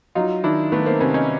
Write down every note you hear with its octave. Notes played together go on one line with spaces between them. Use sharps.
F#3 D#4 F4
D#3 D4 E4
D#3 A3 B3
A#3 C4
C3 B3 C#4
C#4 D#4